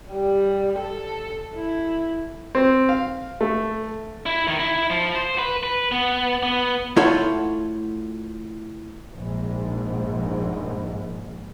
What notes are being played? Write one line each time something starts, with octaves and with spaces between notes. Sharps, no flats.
G3
A4
E4
C4
F5
A3
E4
D#3
E4
F3
C5
B4
B4
B3
B3
A3 E4 F4 A4 C#5 F#5
A#1 G#2